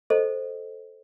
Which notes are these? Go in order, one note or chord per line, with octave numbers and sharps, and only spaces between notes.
A4 C5 D#5